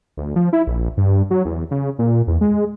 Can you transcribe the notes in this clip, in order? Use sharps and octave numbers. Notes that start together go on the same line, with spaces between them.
D2
F3
E4
A#1
G2
F#3
E2
C#3
A#2
E2
G#3